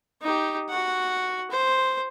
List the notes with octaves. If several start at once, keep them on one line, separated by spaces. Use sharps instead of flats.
D#4 G4
F#4 F#5
C5